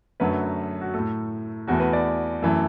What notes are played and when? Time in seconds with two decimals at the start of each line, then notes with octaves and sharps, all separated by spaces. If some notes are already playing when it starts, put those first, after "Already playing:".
0.20 F#2 D3 F#3 A3 B4
0.81 F#4
0.94 A3 A4
0.99 A2
1.67 E2 E3 A3 F#4
1.80 B4
1.93 D5
2.42 F#2 E3 A3